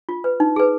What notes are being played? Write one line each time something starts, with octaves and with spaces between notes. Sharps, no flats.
F4
B4
D#4
G#4 B4